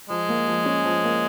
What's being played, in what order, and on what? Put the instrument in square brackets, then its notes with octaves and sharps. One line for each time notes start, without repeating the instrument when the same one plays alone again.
[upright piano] F3 [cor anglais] G#3
[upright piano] A#3
F3
C#4
F3
A#3